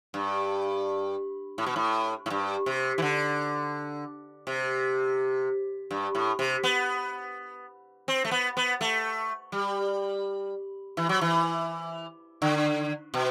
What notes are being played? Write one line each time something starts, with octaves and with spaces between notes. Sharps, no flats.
G2
A2
B2
A2
A2
G2
C3
E3
D3
C3
G2
A2
C3
B3
C4
A3
B3
B3
A3
G3
E3
F#3
E3
D3
B2